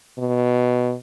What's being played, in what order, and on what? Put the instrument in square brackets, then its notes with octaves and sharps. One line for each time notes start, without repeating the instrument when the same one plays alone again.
[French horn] B2